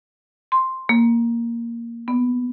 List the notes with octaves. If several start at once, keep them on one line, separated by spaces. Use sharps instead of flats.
C6
A#3
B3